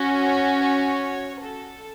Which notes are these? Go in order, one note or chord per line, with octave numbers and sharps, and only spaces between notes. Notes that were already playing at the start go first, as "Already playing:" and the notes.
Already playing: C#4 F#4
C#5
C#5
A4